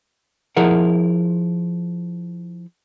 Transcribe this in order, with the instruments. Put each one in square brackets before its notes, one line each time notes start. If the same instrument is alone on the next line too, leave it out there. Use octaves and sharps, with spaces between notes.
[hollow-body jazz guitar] F3 E4 G#4 A#4 F#5